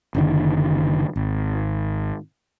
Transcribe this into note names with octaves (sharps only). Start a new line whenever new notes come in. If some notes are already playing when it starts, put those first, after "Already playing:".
F#1 D3 D#3
G#1